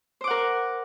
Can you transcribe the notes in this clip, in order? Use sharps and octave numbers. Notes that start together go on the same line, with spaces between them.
A#4 C5 F#5 D6